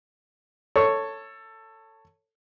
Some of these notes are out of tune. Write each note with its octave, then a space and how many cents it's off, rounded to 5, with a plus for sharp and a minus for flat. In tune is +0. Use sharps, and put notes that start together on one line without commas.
A4 +15 C#5 +0 C#6 +0